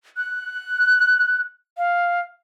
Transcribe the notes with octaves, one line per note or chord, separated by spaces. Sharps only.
F#6
F5